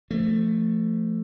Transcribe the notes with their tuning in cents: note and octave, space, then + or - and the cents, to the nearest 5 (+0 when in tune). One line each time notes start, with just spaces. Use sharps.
F3 -20 A3 +10